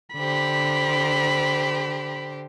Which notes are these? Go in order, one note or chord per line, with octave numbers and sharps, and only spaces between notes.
D3 G4 C5 B5